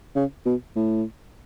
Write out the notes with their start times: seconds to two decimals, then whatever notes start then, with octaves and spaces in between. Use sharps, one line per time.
0.15 C#3
0.45 B2
0.76 A2